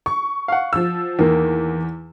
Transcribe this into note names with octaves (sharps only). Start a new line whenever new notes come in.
C#6
F5 F#5
F3 E6
E2 D#3 A#3